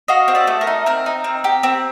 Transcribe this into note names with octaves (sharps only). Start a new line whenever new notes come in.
F#4 D#5 F5
C4
D5 E5
A3
A#4
D#4
C4 A#4
D#4
C4
G4
C4